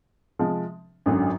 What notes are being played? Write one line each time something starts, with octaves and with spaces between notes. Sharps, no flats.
C3 F3 G#3
G#1 F#2 D3 F#3